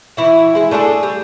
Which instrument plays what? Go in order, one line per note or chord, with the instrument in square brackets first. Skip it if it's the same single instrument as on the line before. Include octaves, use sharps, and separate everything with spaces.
[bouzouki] E3 E4 F#4
G#3 E4
A3 D4 G#4 A4
G3